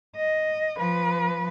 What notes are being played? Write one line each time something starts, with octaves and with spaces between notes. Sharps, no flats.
D#5
F3 B4